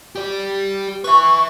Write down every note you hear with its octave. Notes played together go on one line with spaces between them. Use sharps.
G4 D5
B4 E5 C#6